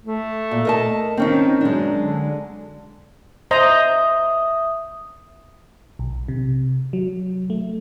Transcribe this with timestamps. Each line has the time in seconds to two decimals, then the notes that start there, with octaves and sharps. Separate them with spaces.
0.05 A3
0.51 A#2
0.65 A#4 D#5 A5
1.17 D#3 C4 C#4 D#4
1.61 F#2 G#3 D4
2.02 D3
3.51 C5 D#5 E5 A#5 D#6
5.99 B1
6.28 C3
6.93 F#3
7.50 A3